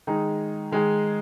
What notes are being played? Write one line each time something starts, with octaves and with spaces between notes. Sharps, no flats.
D#3 G#3 D#4 G#4
D#3 G#3 D#4 G#4